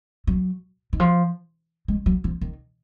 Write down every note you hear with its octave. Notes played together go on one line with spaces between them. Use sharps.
F#3
D#3
F3
G#3
F#3
F3
D#3